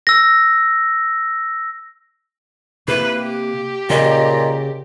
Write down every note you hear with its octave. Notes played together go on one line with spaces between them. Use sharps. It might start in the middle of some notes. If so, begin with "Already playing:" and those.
E6 A#6
C3 A#3 E4 B4
G4
A#2 C#3 D#5